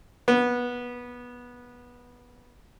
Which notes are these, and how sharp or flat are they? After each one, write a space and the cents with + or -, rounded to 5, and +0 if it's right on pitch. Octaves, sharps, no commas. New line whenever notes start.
B3 -15